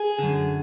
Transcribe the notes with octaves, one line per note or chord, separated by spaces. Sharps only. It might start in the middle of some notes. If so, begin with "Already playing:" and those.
Already playing: G#4
F#2 D3